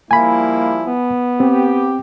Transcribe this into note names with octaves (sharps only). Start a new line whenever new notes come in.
F3 G3 A#3 E4 G#5 B5
B3
C4 G4